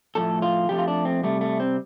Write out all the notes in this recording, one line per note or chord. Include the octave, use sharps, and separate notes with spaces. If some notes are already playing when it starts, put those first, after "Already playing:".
A2 F3 A3 A4
F4
F2 F3 A3 G4
F4
D4
C4
C3 G3 A3
A3
C4